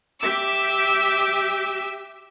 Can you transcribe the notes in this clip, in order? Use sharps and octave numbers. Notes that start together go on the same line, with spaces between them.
G4 E5 D6 E6